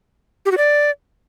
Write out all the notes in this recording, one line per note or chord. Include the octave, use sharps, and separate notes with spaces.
G4
F#4
D5